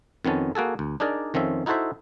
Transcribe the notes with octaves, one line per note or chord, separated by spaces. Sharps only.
F2 D#3 B3 C#4 A5
A#3 F#4 G#4 A4
D2
D4 D#4 G#4 A#4 D5
F2 D#3 F3 C#4 E5
D#4 E4 F#4 A4 C5 E5